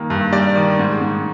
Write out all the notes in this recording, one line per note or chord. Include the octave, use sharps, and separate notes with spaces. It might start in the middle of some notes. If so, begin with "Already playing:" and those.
Already playing: G2 D#3 G3 A#3
G2
G3 D5
D#3
G#2
G#2